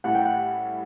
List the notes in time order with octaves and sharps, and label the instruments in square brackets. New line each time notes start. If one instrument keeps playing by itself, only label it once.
[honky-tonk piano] A2 G3 C#4 E4 [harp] F#5
[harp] G5
F#5